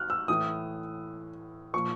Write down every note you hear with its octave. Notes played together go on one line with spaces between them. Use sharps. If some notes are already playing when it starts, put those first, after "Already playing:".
Already playing: F6 F#6
E6
A2 E3 D#6
A#2 F3 C#6